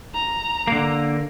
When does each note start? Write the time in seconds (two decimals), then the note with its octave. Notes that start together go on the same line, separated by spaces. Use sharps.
0.14 A#5
0.68 D3 A#3